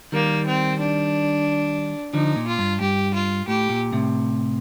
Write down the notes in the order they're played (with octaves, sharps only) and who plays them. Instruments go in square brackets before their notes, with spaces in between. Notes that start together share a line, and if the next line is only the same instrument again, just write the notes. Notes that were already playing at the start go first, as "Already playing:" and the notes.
[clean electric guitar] D#3 G3 [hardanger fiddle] A#3
[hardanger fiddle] C4
D4
[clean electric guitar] D3 F3 [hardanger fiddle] D#4
[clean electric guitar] A#2
[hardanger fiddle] F4
[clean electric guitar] G2
[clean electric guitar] G2 [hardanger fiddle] G4
[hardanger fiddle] F4
[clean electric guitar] A2 [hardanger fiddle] G4
[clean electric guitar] A#2
A2 C3